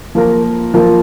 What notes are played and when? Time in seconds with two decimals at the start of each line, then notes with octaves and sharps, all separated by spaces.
0.15 F3 A#3 F4 A#4
0.74 F3 A#3 F4 A#4